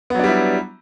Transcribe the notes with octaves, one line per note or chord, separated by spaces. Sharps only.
F#3 G3 B3 D4 E4